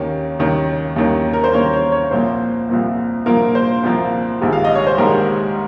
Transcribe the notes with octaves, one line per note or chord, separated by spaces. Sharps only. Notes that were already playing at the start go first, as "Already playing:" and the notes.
Already playing: D#2 D#3 A#3 C#4
D#2 D#3 A#3 C#4
D#2 D#3 A#3 C#4
A#4
C5
D#2 D#3 A#3 C#4 C#5
C#5
C#5
C2 A#2 F3 A#3 C5
C2 A#2 F3 A#3
C2 A#2 F3 A#3 A#4
C5
C2 A#2 F3 A#3
A#1 G#2 D#3 G3
F5
D#5
C#5
C5
A#1 G#2 D#3 G3 A#4